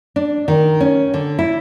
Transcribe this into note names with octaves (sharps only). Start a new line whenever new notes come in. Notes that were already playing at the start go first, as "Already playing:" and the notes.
D4
D#3
C#4
D3
E4